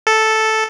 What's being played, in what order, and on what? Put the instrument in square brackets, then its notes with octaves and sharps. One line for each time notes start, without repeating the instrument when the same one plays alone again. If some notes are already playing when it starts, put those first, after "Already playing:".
[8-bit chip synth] A4